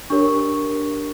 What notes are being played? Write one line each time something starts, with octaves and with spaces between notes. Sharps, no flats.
D4 G4 A#4 C#5 C#6